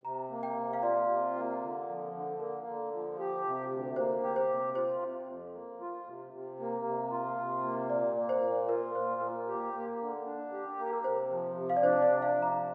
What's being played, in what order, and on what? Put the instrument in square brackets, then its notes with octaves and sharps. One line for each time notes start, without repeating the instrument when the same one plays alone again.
[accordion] C3 [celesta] A#5
[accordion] A#3
[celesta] G5
[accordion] C3
[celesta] F5
[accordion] F4 [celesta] D5
[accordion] C3
A#3
D3
F3
D3
[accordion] A#3 [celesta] A#4
[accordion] D3
F3
G4
C3
D2
[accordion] A#3 [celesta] C5
[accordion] G4
[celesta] C5
[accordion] C3
[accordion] F4 [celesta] C5
[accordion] C3
F2
A#3
F4
C3
C3
A#3
C3
F4
C3
A#3
[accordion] A#2 [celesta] D5
[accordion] A#3
[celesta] C5
[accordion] A#2
[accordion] F4 [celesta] A#4
[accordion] A#2 [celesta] C5
[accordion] A#3 [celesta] A#4
[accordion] G4
A#3
D3
D4
G4
A#3
[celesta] A#4
[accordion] C3 [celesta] C5
[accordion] F3
C3
[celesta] F5
D5
[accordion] D4 [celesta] C5
[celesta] D5
[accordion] C3
[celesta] F5
[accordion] F3
[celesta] A#5